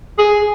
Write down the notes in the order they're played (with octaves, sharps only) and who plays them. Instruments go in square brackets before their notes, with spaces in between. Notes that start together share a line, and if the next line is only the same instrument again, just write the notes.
[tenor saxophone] G#4